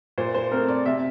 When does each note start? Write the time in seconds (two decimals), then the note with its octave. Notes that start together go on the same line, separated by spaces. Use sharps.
0.18 A#2 C5
0.34 C5
0.51 A3 C4 A#4
0.68 D5
0.86 C3 E5